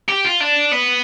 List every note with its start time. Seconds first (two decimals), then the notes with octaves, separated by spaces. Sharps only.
0.09 G4
0.25 F4
0.41 D4
0.73 B3